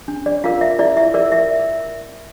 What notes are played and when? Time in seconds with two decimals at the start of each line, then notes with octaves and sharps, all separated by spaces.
0.08 D4
0.26 D5
0.44 F4 A#4 F5
0.61 E5
0.79 E4 D5
0.97 E5
1.14 A#4 D5
1.32 E5